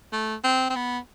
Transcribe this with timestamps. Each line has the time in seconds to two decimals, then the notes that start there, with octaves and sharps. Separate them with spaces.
0.13 A3
0.44 C4
0.70 C4
0.76 B3